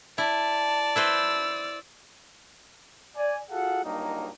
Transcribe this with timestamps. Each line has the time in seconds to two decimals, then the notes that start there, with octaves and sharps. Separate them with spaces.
0.18 E4 D5 A5
0.96 E4 B4 C5 E6
3.16 D5 G#5
3.50 F4 F#4 G#4 A4 F5 F#5
3.84 C#2 G2 F#3 A#3 D#4